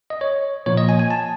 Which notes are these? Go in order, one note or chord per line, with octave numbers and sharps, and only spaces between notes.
D#5
C#5
A#2 F3 A#3 C#5
D#5
G#5
G#5
A5